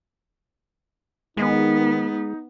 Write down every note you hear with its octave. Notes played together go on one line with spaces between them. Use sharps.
D#3 G#3 B3 D#4